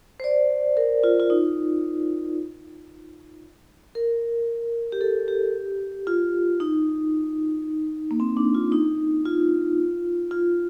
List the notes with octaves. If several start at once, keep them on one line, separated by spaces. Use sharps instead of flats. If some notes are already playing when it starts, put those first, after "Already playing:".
C5
D5
A#4
F4
F4
D#4
A#4
G4
A4
G4
F4
D#4
A#3
C4
D4
F4
D#4
F4
F4